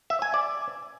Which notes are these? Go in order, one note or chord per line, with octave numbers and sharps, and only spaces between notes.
E5
G#5
D5